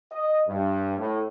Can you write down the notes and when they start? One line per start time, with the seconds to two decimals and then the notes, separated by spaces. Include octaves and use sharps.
0.11 D#5
0.47 G2
0.98 A2